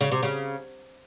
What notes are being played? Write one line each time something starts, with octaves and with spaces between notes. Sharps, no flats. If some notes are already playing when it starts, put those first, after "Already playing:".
C#3
C3
C#3